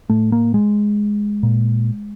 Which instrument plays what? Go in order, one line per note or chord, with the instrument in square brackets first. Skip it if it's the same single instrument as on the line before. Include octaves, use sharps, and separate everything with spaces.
[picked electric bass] A2 A3
A#3
G#3
A#2